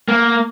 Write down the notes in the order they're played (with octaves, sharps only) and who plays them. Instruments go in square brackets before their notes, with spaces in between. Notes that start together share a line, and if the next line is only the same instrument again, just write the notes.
[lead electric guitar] A#3